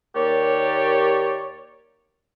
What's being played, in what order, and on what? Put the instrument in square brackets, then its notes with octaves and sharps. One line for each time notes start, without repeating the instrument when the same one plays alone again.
[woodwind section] D#2 A#3 G4 C#5 D5